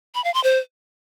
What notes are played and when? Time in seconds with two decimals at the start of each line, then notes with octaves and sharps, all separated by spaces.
0.15 B5
0.24 F5
0.34 C6
0.44 C5